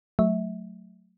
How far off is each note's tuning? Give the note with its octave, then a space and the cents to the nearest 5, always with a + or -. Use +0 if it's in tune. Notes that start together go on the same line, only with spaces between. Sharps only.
F#3 +0 A3 +0 E5 -20